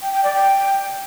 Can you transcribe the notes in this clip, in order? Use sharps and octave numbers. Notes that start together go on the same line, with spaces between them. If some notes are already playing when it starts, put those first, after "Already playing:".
G5
G5
D5
G5